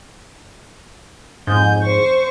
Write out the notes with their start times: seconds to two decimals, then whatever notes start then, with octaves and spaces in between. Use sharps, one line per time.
1.47 F2 G#2 G#5 G6
1.82 C5 C#6